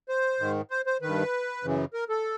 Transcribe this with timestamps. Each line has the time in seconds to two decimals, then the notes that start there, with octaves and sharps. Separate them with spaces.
0.09 C5
0.40 G#2 D#3
0.71 C5
0.87 C5
1.02 G2 D#3 B4
1.63 F#2 C#3 E3
1.94 A#4
2.09 A4